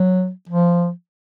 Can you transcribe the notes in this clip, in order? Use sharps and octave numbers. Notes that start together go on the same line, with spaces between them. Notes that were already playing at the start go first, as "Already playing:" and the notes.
Already playing: F#3
F3